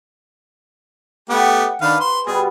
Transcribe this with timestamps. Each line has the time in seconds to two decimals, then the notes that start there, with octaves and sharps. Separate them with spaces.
1.29 A3 B3 G4 F#5 G5
1.81 D#3 D4 B4 F5
2.00 C5 C6
2.27 B2 G3 B3 G#4